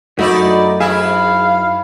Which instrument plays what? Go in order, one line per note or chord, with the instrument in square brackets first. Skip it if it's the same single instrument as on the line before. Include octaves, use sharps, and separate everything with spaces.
[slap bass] F#2 [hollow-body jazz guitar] A3 [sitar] D#4 E4 D5 [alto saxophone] F#4
[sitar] G#2 E4 E5 [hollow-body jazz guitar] G#4 [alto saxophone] F5